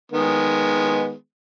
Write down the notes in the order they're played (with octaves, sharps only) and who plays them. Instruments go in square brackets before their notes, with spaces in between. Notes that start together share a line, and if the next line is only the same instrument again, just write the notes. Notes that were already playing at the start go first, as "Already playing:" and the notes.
[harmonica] D#3 G#3 B3